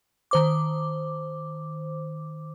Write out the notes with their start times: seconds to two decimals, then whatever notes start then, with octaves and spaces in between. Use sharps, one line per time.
0.31 D#3 C5 D6